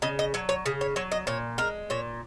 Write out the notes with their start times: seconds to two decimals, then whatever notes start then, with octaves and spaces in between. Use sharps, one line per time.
0.02 C#3 D#5
0.19 D#5
0.34 F#3 C#5
0.49 C#5
0.66 C#3 G#4
0.81 C#5
0.96 F#3 C#5
1.12 D#5
1.27 A#2 C#5
1.58 G#3 A#4
1.90 A#2 C#5